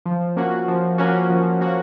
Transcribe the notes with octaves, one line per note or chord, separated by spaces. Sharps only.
F3
A#3 C#4 F#4
F3
A#3 C#4 F#4
F3
A#3 C#4 F#4